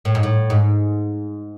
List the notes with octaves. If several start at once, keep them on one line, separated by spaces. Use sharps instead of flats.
A2
G#2
A2
G#2